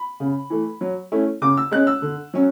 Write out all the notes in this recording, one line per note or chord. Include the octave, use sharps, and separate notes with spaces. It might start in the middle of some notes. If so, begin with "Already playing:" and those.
Already playing: B5
C#3
E3 A3
F#3
A3 C#4 E4
C#3 D6
E6
G#3 C#4 F#6
E6
D3
F#3 C#4